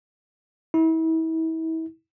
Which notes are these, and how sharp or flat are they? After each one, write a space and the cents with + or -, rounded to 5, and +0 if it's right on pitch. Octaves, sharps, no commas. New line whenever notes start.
E4 -35